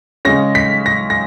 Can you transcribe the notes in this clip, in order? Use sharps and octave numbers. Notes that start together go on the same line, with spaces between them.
C#3 G#3 C#4 A#6
B6
A#6
A#6